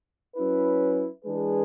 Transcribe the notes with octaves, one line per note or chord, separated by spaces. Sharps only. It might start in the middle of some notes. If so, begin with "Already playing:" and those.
F#3 C#4 E4 B4
E3 G#3 D4 G#4 B4